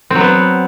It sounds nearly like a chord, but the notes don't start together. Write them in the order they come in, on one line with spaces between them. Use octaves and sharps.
C4 F#3 B3